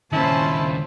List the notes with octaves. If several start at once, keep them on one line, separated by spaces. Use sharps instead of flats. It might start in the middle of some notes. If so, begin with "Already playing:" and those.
D#2 A#2 C#3 C#4 E4 C5 A5